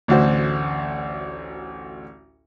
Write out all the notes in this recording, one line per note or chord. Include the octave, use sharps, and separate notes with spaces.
A1 D2 F#4 C5